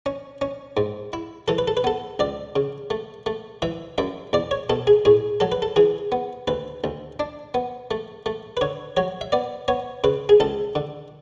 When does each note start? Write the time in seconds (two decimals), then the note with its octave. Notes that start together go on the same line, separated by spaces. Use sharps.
0.06 C#4
0.41 C#4
0.77 G#2
1.13 E4
1.48 E3 A4
1.58 B4
1.68 A4
1.77 B4
1.84 B3 A4
2.19 C#2 D5
2.56 C#3
2.90 A3
3.26 A3
3.62 E3 E5
3.98 F#2 E5
4.33 E2 D5
4.51 C#5
4.70 B2 A4
4.87 G#4
5.05 A2 G#4
5.40 F#3 A4
5.52 B4
5.62 A4
5.76 E3 G#4
6.12 B3
6.47 D2 B4
6.84 D2
7.20 D4
7.54 B3
7.91 A3
8.26 A3
8.57 B4
8.61 D3 C#5
8.97 F#3 C#5
9.21 E5
9.32 B3 D5
9.68 B3 C#5
10.04 C#3 B4
10.29 G#4
10.40 C#2 A4
10.75 D3